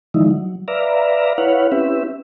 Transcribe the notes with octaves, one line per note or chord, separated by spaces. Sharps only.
D3 D#3 F3 G#3 D#4 E4
F#3
B4 D5 E5 F5 A#5
E4 B4 C#5 F5 F#5
C4 C#4 E4 G4 B4 E5